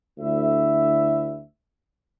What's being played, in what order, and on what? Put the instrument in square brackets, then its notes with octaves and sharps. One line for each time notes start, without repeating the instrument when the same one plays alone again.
[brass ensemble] D2 E4 E5